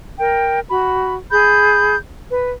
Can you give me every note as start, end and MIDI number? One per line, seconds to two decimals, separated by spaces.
0.19 0.59 70
0.19 0.59 79
0.69 1.15 66
0.69 1.15 83
1.30 1.96 68
1.30 1.96 83
1.30 1.96 91
2.30 2.51 71